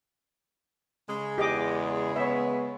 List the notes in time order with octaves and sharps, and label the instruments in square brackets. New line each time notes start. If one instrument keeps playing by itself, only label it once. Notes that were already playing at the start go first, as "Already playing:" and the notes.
[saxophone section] C#3 G#3
[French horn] E2 [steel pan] G4 D#5 D6
[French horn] B3 [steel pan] C#5 E5